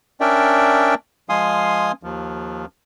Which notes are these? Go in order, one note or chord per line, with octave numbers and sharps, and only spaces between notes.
C#4 D4 A#4 D5 E5 G5
F3 G#3 F5 G#5 C6 D#6
D#2 F3